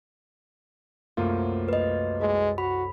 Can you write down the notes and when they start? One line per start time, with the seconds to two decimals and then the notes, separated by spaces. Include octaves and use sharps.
1.17 C2 F#2 A3 A#3 F4
1.68 B4 D#5
2.21 G#3 E4 A4
2.58 F#4 B5